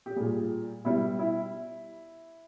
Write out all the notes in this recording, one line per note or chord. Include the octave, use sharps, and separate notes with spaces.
G4
A#2 G3 G#4
B2 G3 E4
E4